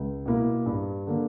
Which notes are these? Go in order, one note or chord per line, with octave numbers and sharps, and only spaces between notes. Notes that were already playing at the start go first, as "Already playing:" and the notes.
Already playing: C#2
B2 A#3 E4
G2
D3 A#3